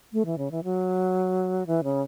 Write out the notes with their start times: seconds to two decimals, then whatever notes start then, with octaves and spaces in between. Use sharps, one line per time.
0.13 A3
0.25 E3
0.38 C#3
0.51 E3
0.64 F#3
1.67 E3
1.84 C#3